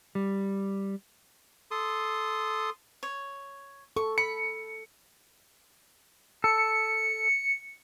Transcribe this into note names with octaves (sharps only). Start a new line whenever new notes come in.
G3
A4 C6 D#6
C#5
A4 C#6
B5 C#7
A4 C#7